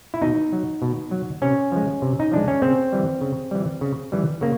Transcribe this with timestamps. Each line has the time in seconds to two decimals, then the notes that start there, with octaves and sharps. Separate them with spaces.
0.14 E4
0.22 B2 D#4
0.52 F#3
0.82 B2
1.11 F#3
1.42 C3 C#4
1.72 F3 G#3
2.02 C3
2.20 D#4
2.32 F3 G#3 D4
2.48 C#4
2.62 C#3 C4
2.92 E3 G3
3.21 C#3
3.51 E3 G3
3.81 C#3
4.12 E3 G3
4.41 C#3 A#3